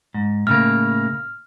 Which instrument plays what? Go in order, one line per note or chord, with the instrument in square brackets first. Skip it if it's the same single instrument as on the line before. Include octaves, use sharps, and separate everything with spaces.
[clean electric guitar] G#2
[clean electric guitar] A2 C#3 A#3 [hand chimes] F6